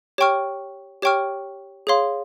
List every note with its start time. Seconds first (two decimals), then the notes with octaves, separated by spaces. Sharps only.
0.18 G4 C#5 G5 C#6 F6
1.02 G4 C#5 G5 C#6 F6
1.87 G#4 C#5 F5 C6